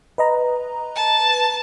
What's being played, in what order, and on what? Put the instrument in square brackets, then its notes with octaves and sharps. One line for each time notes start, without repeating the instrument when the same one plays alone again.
[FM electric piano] B4 D#5 A#5
[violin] A5